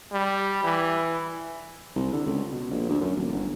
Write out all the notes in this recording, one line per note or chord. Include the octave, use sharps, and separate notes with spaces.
G3
E3
C2
D3
C#2
B2
A#1
D2
F#2
D#1
G1